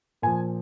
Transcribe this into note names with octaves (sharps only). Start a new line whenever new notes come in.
A#2 F3 G#5